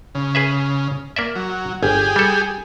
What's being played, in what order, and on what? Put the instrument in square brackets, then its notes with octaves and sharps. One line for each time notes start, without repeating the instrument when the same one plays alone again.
[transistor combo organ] C#3
[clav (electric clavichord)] G#4 B4 E5
A#3 D5 E5
[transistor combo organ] F#3
[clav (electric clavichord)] G1 [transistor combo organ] G4 G#4
[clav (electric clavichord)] G3 A4